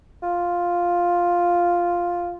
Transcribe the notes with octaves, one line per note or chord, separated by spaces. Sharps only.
F4